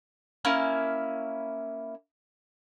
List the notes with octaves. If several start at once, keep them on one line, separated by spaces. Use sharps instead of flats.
A#3 C#4 E4